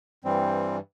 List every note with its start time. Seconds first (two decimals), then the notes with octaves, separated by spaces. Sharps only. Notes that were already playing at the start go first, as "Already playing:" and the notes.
0.24 G2 E3 G3 C4